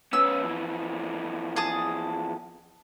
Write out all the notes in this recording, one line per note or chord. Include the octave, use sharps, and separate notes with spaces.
B3 C#4 E6
F2 E3
G#4 A5 D#6